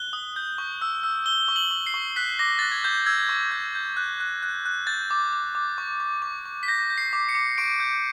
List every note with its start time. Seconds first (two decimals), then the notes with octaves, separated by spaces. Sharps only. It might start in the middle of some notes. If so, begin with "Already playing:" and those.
Already playing: F#6 G7
0.13 D#6
0.36 G6
0.58 C#6
0.82 E6
1.04 E6
1.26 E6 G7
1.48 C#6
1.56 F#7
1.71 C#6
1.87 C7
1.94 C#6
2.16 F#6 B6
2.39 D6 A#6
2.59 F#6 A6
2.71 G#6
2.84 D6 G6
3.06 E6 G#6
3.29 C#6
3.51 G6
3.75 G6
3.97 F#6
4.20 F#6
4.43 F#6
4.65 F#6
4.87 G6 A6
5.11 D6
5.33 D6
5.55 D6
5.78 C#6
6.00 C#6
6.22 C#6
6.45 C#6
6.63 B6
6.68 G6 A#6
6.90 G6
6.98 C7
7.13 D6
7.29 C#7
7.35 D6
7.58 C#6 D7
7.80 G6